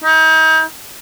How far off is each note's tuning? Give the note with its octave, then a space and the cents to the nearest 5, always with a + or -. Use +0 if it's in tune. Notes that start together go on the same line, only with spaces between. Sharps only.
D#4 +35